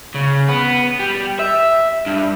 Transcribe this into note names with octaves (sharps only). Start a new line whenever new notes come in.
C#3
B3
G3
E5
G2